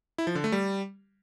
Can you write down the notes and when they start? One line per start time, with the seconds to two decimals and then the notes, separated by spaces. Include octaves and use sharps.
0.18 E4
0.27 F3
0.35 D3
0.44 A3
0.52 G3